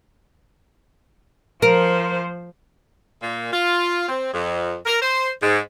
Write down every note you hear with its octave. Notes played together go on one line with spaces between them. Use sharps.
F3 A#4 C5
A#2
F4
C4
F2
A#4
C5
G#2